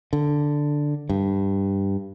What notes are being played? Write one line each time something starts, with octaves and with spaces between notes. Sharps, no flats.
D3
G2